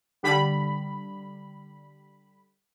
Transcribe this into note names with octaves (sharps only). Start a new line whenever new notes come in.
D3 G3 B5